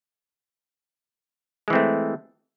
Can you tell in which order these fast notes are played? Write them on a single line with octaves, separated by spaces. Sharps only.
G#3 E3 C4 A3